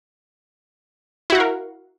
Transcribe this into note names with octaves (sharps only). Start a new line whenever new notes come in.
E4 F#4 A#4 F5 F#5